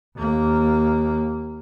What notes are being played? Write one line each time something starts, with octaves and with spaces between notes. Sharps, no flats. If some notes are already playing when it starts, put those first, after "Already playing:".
D#2 A#3